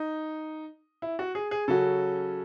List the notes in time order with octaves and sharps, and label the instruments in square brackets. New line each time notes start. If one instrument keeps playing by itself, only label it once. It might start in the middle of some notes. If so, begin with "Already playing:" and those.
Already playing: [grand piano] D#4
E4
F#4
G#4
G#4
[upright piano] C#3 F#3 C#4 F#4 [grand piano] A4